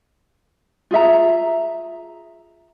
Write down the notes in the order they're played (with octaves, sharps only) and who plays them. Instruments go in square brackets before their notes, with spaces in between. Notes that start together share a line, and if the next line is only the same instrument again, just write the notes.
[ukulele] F4 G#4 E5 A#5